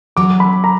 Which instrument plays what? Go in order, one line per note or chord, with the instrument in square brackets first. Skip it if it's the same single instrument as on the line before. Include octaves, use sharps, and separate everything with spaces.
[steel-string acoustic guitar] F#3 [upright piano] D6
[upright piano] B5
A#5